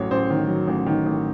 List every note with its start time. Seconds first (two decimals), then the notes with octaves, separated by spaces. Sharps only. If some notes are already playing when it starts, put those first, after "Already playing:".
Already playing: A1 F#3 C#5
0.11 A1 C5
0.30 D#3
0.48 F#3
0.67 A1
0.86 D#3
1.06 A1